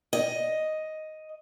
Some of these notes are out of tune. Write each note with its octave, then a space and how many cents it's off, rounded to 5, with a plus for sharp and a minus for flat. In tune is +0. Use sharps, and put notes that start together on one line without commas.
D#5 +5